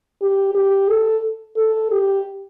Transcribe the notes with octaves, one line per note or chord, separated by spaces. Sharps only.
G4
G4
A4
A4
G4